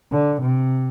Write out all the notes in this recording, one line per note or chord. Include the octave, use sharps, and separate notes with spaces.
D3
C3